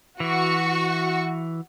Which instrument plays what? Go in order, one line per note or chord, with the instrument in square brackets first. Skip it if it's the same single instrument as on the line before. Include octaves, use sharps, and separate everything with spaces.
[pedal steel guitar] E3 [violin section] F#4 C#6